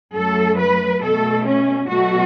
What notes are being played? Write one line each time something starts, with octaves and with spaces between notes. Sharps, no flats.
F#2 F#3 A3 A4
B4
B2 A3 A4
C#4
B2 F#3 A3 F#4